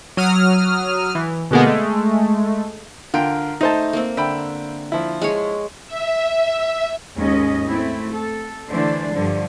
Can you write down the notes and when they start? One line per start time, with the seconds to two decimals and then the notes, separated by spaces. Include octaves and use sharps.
0.17 F#3 D#6 F6
1.15 E3
1.51 B2 D3 G#3 A#3 B3
1.66 G#3 A3
3.14 D3 F4 A#4 G5
3.61 A3 D#4 C5 A5
3.93 A#3 C4
4.17 D3 E5 G5 B5
4.92 F3 E4
5.22 G#3 G#4 C#5
5.87 E5
7.16 D#2 G#2 G#3 C#4 D#5
7.67 A3 C4 E4
8.11 A4
8.70 D3 E3 A3 D4 C5
9.13 G2 D3 F3